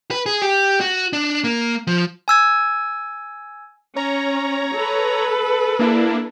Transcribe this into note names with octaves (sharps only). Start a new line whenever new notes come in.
B4
G#4
G4
F#4
D4
A#3
F3
G#5 E6 G#6
C#4 C#5 A#5
A4 B4
A#3 D4 E4